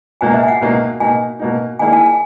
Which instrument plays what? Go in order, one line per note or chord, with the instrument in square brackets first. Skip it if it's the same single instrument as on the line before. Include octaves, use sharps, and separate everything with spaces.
[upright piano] C#2 B2 A#3 D#4 [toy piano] G#5
[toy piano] E5
G#5
F#5
[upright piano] C#2 B2 A#3 D#4
[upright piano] B2 A#3 D#4 [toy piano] G#5
[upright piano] B2 A#3 D#4
[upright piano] D#3 A#3 E4 G#4 [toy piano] G#5
[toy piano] G#5
G#5